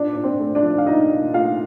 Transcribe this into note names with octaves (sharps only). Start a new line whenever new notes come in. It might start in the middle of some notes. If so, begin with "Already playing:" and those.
Already playing: A#2 D4 D5
A#2 D5
C4 C5
A3
D4 D5
F3
F5
A#2 D#4 D#5
A#2
A3 F4 F5